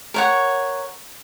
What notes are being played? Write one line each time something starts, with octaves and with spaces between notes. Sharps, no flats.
A#4 C#5 F#5